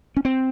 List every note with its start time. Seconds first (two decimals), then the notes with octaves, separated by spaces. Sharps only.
0.17 C#4
0.25 C4